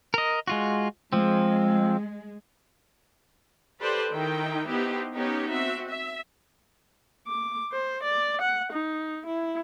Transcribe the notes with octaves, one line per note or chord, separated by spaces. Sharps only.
A#4 D#5
G#3 F4 F#4
F3 G#3 C4
G4 A4 B4 C5 D5
D#3 D#4 E4 G5
B3 D#4 E4 G4 C5
B3 C#4 D#4 G4 C#5
C4 F#4 E5
E5
D6
C5
D5
F#5
D#4
E4